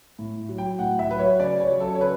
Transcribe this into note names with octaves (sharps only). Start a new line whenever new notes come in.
A2
F#3
G5
A2 F#5
E5
F#3 B4
C#5
C#3 D5
C#5
F#3
A4
C#5
C#3 B4